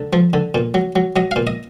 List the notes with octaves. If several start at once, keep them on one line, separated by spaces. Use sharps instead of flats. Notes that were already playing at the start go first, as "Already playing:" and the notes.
Already playing: D3
F3
D3
A#2
F#3
F#3
F#3 D#5
A#2 F5
D#5